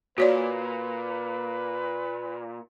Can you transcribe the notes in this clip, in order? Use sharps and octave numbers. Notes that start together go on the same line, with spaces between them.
A#2 F#4 B4 C#5 D5